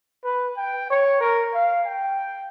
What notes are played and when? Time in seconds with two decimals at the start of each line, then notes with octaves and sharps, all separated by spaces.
0.24 B4
0.57 G5
0.90 C#5
1.20 A#4
1.54 F5
1.85 G5